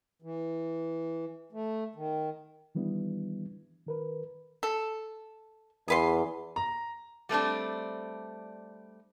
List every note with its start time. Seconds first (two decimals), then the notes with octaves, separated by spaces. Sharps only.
0.22 E3
1.52 A3
1.96 D#3
2.75 D#3 E3 G3 B3 D4 E4
3.86 D#3 A#4 B4
4.63 A4
5.88 E2 G#4 B4 C6
6.56 A#5
7.29 G3 A3 C4 D4